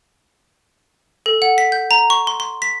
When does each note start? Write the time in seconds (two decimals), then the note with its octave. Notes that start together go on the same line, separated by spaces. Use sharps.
1.26 A4
1.42 F#5
1.58 B6
1.72 G6
1.91 A#5
2.10 C#6
2.27 C6
2.40 C6
2.62 B6